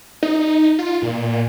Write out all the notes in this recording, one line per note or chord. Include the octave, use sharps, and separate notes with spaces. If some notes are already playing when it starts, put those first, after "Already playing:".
D#4
F4
A#2